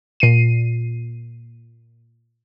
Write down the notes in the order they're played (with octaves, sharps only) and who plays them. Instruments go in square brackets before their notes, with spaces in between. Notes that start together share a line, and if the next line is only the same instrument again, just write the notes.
[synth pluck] A#2 C7 D#7